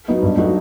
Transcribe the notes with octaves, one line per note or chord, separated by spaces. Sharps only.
F#3 B3 D#4
G2
F#3 A3 D#4 F#4